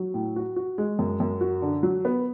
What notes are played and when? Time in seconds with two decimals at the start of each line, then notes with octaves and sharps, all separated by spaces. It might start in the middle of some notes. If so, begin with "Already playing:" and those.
Already playing: F#3
0.14 A2
0.36 F#4
0.56 F#4
0.78 G#3
0.99 F#2
1.20 F#2
1.41 F#4
1.62 D3
1.83 F#3
2.05 B3